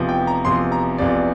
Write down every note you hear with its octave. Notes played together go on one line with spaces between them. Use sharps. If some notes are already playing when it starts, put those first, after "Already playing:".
Already playing: F1 E2 C3 F3
G5
A#5
F1 E2 C3 F3 C6
A#5
F1 E2 C3 F3 D5